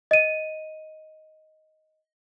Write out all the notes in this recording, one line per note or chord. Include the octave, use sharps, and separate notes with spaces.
D#5 D#7